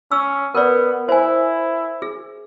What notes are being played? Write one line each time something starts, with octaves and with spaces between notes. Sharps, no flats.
C#4 E6
B3 A#4 B4 D5
E4 C5 G#5
G#4